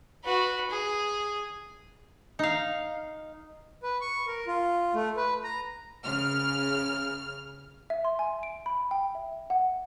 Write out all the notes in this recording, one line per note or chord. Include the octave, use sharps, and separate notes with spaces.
F#4 B4
G#4
D#4 F5
B4
C#6
A#4
F4
A3
B4
A#5
C#3 F6
E5
C6
G#5
D7
B5
G5
E5
F#5